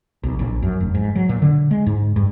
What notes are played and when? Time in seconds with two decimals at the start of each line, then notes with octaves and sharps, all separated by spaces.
0.23 B1
0.39 A#1
0.62 F#2
0.80 F1
0.94 G#2
1.15 F#3
1.29 A#2
1.42 D3
1.71 G#3
1.86 G#2
2.16 G2